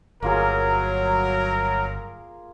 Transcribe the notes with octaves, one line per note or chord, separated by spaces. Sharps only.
G1 F#3 A#3 F4 G#4 A#4